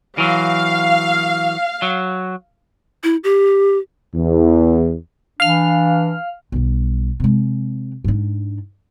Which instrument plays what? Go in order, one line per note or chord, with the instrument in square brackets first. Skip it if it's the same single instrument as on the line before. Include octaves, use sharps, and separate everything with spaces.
[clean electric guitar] E3 F#3 [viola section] F5
[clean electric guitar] F#3
[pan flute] E4
G4
[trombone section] E2
[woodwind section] E3 D4 [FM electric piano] F5 F6
[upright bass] B1 G3
C3 G#3
G#2 D4